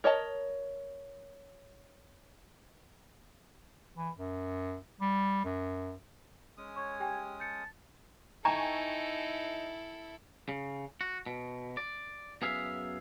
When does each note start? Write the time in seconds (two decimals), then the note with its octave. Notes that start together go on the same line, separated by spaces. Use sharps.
0.04 A#4 C#5 D#5 A5
3.97 E3
4.17 F#2
5.01 G3
5.45 F#2
6.57 G#3 C#4 D#6
6.76 C#5 C#6
7.00 G4 G5 G#5
7.40 A5 G6 C#7
8.45 D#4 E4 A4 G5 G#5 A#5 C#6
10.49 C#3
11.01 F#4
11.26 B2
11.77 D5
12.42 F#2 B3 G#4 E5 F5